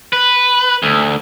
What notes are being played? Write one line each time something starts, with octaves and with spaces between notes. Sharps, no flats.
B4
D2